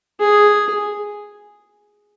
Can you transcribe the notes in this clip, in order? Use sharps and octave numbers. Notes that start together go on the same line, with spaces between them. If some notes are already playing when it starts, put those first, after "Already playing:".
G#4